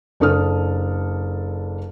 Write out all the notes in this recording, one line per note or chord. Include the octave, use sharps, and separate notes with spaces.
F#1 D4 A4 D#6 F6